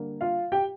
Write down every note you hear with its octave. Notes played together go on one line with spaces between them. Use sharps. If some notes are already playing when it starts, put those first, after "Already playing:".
Already playing: D3 G3 A#3
F4 F5
G4 G5